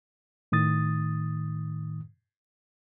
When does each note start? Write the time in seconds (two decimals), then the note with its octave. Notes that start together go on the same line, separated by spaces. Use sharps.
0.52 A2 D#3 D#6 A6